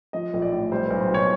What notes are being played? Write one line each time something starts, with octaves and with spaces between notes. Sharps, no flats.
F3 D#5
A#1
D5
A2
G3 C5
B1 B4
C5
B2 C#5